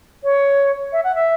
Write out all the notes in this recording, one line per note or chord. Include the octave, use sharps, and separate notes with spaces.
C#5
E5
F#5
E5